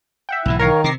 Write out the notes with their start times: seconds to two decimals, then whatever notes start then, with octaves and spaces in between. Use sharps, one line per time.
0.29 E5 F#5 G5
0.45 B1 G#2 E3 E4
0.59 D#3 A#4 C#5 F5
0.84 C3 D6 A#6 C7